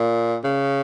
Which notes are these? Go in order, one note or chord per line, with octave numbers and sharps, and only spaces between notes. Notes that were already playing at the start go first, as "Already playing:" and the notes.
Already playing: A#2
C#3